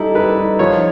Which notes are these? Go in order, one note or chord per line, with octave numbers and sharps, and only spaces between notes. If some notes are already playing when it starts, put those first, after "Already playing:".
Already playing: G3 D#4 E4 A4
G3 B4
D#4
F3 C#5